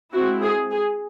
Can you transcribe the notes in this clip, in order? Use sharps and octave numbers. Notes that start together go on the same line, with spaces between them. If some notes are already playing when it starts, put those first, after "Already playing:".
G#3 C4 E4 F#4
G#4
G#4